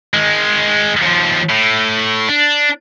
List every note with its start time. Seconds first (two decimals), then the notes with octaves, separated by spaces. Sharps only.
0.14 D#3 G#3
1.02 D#2 F3
1.49 A2
2.29 D4